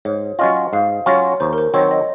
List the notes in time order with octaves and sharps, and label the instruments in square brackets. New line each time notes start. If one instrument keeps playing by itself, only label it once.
[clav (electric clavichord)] G#2 [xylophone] C#5
[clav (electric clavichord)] F#3 C#4 F4 [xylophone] D#5
[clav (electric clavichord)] G#2 [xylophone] F5
[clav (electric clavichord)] F#3 C#4 F4 [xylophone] C#5
[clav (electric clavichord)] D#2 [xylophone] C5
[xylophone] A#4
C5
[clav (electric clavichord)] D#3 F#3 C4 [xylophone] C#5
[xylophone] D#5